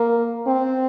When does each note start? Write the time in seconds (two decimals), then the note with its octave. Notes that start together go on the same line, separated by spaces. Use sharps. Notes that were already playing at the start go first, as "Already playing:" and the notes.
Already playing: A#3
0.47 C4